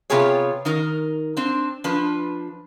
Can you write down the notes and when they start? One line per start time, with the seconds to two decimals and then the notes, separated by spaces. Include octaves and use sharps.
0.10 C3 B3 F4 G4 G#4 C#5
0.65 D#3 D#4 A#4
1.37 C4 D4
1.84 F3 D4 B4